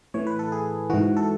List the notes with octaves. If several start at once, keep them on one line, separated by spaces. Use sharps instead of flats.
A2 E3 C#5
B4
A4
G#4
G#2 E3 F#4
A4